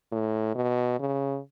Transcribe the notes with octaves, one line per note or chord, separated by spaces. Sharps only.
A2
B2
C#3